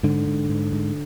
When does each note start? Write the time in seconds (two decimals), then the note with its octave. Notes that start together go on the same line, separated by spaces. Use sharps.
0.03 G#2 D3
0.27 G#2
0.49 G#2
0.73 G#2